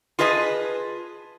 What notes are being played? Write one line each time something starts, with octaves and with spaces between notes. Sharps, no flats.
F4 G#4 B4 D#5 A5